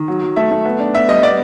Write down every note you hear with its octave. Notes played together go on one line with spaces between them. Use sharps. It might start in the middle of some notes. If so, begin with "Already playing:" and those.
Already playing: D#3
F#3
F#3
A3 E5
A3
B3
D4
B3 E5
G3 D#5
B3 D5